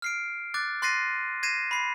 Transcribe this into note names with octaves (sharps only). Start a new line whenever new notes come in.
F6 C7 D7
D6 F#6 A6
C6 F#6 A6 A#6 C7 D#7
G#6 A#6 C7 D#7 E7
B5 C7